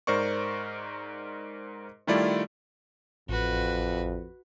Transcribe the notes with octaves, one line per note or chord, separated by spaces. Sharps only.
G#2 A#4 C5 D5 C#6
D#3 G3 A3 E4 F4 D5
A1 F2 F#4 B4